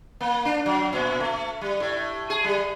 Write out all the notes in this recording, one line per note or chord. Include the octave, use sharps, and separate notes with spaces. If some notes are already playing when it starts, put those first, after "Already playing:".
A#3
D4
F#3
A#2
A3
G3
A2
G#4
G3